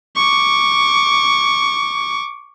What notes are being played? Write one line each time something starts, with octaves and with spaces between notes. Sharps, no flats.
C#6 D6